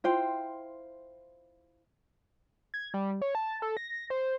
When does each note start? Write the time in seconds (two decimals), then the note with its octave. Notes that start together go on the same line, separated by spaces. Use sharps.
0.04 E4 F4 C5 G5
2.74 G#6
2.94 G3
3.22 C#5
3.35 A5
3.62 A4
3.77 A#6
4.10 C5